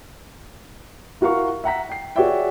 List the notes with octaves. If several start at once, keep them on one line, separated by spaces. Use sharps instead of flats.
E4 F#4 A#4 F5 C#6
E5 F#5 A#5 B6
G5 C7
F#4 G#4 C#5 D5 E5 G5